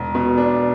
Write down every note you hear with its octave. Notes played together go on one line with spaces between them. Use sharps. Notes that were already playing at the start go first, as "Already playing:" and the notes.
Already playing: E1
B2
D4